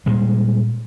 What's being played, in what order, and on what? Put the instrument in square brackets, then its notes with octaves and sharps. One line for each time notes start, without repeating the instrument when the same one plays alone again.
[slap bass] A#2 G3 G#3